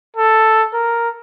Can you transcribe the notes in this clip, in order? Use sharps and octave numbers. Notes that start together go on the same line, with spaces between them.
A4
A#4